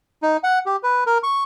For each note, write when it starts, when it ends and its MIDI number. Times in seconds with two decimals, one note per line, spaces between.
0.22 0.37 63
0.44 0.59 78
0.66 0.76 67
0.83 1.04 71
1.06 1.18 70
1.23 1.44 85